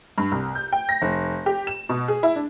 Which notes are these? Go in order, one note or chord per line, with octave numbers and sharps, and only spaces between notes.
G2
C2
G6
G5
A#6
F1
G4
E7
B2
G#4
E4
D4